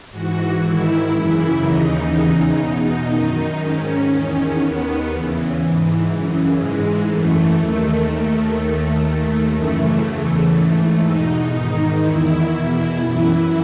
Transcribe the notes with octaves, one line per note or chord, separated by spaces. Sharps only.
G#2 E3 F#4
G#2 D#3 E4
F#2 C#3 E3
D#2 C#3 E3 D#4
E2 C#3 E3
E2 B2 D#4
F#2 D#3
G#2 D#3 C#4
E2 D#3
D#2 D#3 B3
E2 C#3 E3
G#2 E3
F#2 C#3 E3
G#2 E3 G#3
F#2 E3 A3
D#2 D#3
D#2 D#3
D#2 D#3
D#2 D#3 A3
F#2 C#3 E3
E2 C#3 E3 A3
G#2 E3
E2 B2 D#4
G#2 D#3
E2 D#3 E4
E2 B2
F#2 E3